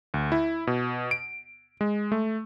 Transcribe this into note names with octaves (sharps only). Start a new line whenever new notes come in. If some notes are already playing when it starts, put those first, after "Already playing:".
D2
E4
B2
D7
G#3
A3